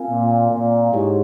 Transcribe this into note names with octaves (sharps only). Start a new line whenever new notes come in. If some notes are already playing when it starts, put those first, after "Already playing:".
Already playing: C4 F4 A#4 F5 G#5
A#2
A#2
G#2 E4 G4 C#5